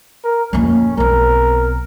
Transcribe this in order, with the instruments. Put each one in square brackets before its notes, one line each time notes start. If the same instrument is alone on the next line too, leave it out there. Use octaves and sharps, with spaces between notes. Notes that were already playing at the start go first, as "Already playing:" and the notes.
[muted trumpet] A#4
[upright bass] F2 A#2 [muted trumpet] C#4
[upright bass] B1 C4 [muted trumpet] A#4